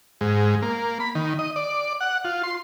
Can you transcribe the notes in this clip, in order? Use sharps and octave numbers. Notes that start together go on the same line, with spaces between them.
G#2
A#3
B5
D#3
D#5
D5
F#5
F4
C6